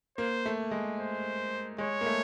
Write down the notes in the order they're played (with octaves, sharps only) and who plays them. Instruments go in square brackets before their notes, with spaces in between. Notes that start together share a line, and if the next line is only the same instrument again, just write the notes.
[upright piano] A#3 [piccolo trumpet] C5
[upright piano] A3
G#3
[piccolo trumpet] C5
[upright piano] G#3 [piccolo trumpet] C#5
[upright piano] A#3
A3